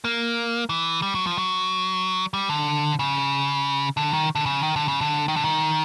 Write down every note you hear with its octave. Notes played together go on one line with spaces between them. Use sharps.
A#3
E3
G3
F#3
F3
F#3
G3
D3
C#3
D3
D#3
D3
C#3
D#3
D3
C#3
D3
D#3
D3
D#3